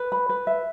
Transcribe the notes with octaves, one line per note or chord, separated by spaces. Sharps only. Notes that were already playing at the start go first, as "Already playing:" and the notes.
Already playing: B4
B5
B4
E5